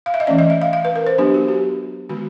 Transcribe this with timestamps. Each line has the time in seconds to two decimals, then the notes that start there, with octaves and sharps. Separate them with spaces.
0.06 F5
0.14 E5
0.20 D#5
0.27 E3 A3 C#4 D5
0.38 D#5
0.50 E5
0.62 F5
0.73 F5
0.85 B4
0.96 A#4
1.07 C5
1.18 F#3 B3 D4 G4
1.34 F#4
1.48 G4
2.09 D#3 G#3 B3 F#4